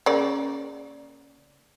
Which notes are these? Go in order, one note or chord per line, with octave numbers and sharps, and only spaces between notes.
C#3 A#3 D5